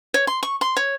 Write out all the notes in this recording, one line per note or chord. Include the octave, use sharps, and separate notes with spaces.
C#5
C6
C#6
C6
C#5